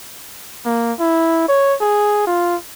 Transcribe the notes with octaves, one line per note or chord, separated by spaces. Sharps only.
A#3
E4
C#5
G#4
F4